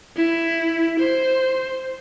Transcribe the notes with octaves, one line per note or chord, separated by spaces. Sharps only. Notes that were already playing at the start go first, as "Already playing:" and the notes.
E4
C5